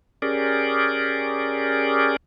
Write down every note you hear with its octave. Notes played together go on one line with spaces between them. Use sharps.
C#4 G4 G#4 A#4 D5